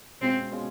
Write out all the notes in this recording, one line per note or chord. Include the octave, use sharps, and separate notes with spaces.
B2 G#3 C4 C#4 F4
B2 G#3 C#4 F4